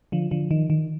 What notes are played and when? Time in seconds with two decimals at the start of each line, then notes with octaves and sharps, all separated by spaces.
0.12 D3 F3
0.31 D3 F3
0.51 D#3
0.70 D#3